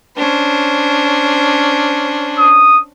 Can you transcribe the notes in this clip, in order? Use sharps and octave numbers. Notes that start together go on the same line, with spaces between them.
C#4 D4 C5
D#6